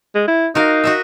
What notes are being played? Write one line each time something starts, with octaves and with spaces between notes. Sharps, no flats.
G#3
E4
D#4 F#4 A#4 F5
F#4 D#5 E5